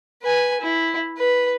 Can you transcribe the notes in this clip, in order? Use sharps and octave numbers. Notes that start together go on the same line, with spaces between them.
B4 G#5
E4
B4